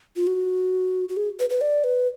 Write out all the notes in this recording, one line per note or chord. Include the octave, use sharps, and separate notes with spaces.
F4
F#4
F#4
G#4
B4
B4
D5
B4